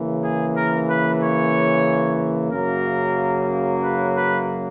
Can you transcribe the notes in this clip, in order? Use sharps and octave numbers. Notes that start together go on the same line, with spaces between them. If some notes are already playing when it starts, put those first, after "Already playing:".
Already playing: C#3 E3 A#3
G#4
A#4
B4
C#5
F#2 C#3 F#3 A#3 A#4
B4
B4